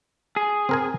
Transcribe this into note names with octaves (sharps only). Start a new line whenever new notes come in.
G#4
C4 A#4 G#5